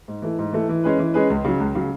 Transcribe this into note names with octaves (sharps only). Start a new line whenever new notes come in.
G#2
E3 A3
G#2
E3 A3
E3
G#3 C#4 G#4 B4
E3
G#3 C#4 G#4 B4
C#2
C#3 F#3
C#2
C#3 F#3